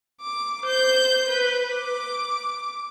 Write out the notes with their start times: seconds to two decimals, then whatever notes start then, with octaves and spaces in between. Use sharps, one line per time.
0.21 D6
0.63 C5 G6
1.29 B4
1.76 D6